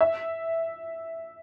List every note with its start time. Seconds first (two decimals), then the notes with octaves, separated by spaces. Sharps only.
0.01 E5